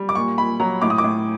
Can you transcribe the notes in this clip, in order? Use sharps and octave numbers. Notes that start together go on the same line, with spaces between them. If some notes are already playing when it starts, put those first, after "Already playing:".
Already playing: G3
D6
A#2 C#6
A#2 B5
F#3 A#5
A2 D6
D#6
D6
A2